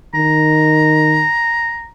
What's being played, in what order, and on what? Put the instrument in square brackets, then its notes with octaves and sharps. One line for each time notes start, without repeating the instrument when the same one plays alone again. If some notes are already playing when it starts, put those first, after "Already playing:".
[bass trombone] D#3 [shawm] A#5